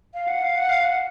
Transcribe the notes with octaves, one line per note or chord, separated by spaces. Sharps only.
F5
F#5
F5
F#5
F5
F#5